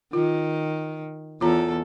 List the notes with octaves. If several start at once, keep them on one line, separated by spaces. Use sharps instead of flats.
D#3 F4
E2 F4 A4 C#5 A#5